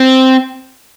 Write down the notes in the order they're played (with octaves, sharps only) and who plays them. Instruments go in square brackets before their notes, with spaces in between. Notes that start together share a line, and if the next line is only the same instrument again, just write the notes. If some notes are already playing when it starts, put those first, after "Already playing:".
Already playing: [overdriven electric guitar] C4